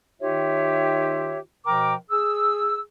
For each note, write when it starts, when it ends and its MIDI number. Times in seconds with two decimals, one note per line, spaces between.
0.21 1.39 51
0.21 1.39 63
0.21 1.39 65
0.21 1.39 67
0.21 1.39 73
0.21 1.39 76
1.66 1.94 47
1.66 1.94 53
1.66 1.94 70
1.66 1.94 79
1.66 1.94 82
1.66 1.94 86
2.10 2.80 68
2.10 2.80 88